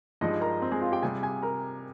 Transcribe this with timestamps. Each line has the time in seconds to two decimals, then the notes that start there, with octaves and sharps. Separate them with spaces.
0.21 G2 F3 G#3 D#4 D#5
0.41 A#4 A#5
0.62 C4 C5
0.72 G#3 G#4
0.82 F4 F5
0.92 G4 G5
1.02 C3 G3 G#4 G#5
1.23 G#4 G#5
1.43 A#4 A#5